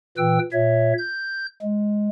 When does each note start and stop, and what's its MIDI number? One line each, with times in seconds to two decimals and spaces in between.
0.18 0.39 46
0.18 0.39 52
0.18 0.39 71
0.18 0.39 79
0.18 0.39 88
0.52 0.93 46
0.52 0.93 73
0.52 0.93 76
0.98 1.46 91
1.63 2.09 56